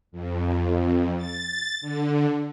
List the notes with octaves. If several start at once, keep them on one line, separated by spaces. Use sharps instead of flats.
F2
A6
D3